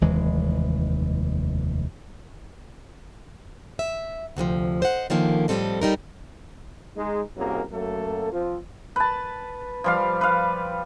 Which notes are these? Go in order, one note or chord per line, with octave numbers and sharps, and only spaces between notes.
F1 D#2 E3 G#3
E5
D2 C3 D#3 F3
C5 D#5 F#5
D3 D#3 F3 A#3 C#4
A2 F3 G3 C4 A4 D#5
G3 D#4 A#4
G#3 D#4
C2 F#2 F#3 A#3 G#4 A#4
F#2 F#3 A3 A#3 A4
F3 C4 F4
B4 A5
F3 G3 F5
B4 F5